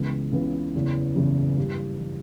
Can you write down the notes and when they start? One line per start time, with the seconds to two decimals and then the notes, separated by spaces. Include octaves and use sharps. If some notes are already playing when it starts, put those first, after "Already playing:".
Already playing: C#2 C#3 E3 G#3 B3
0.32 C#2 C#3 E3 G#3 B3
0.75 F#1 E2 C#3 E3
1.15 F#1 E2 C#3 E3
1.57 G2 E3 G3
1.98 E3 G3